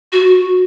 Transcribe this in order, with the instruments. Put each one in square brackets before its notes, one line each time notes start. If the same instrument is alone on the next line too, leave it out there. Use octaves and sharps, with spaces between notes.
[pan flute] F#4